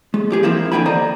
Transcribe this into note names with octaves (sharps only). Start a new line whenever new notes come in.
G#3
G#3 G4 G#4
E3 F3 A#3 C4 E4 E5
C#2 D3 G4 G5 G#5 B5
D#2 C5 D5 D#5 A#5